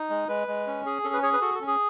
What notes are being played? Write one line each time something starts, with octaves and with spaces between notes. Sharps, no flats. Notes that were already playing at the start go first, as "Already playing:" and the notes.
Already playing: D#4
G#3
G#3 B4
G#3
C#4
G#4
C#4 A4
B4
G#4 C#5
B4
F#4 A4
A4
C#4
G#4